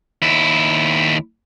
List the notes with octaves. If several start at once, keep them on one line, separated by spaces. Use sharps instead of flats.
D#2 E4